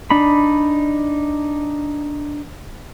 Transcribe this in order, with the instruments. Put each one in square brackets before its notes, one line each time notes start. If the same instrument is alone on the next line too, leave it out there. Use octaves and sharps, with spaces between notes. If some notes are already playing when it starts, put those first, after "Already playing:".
[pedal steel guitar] D4 D#4 B5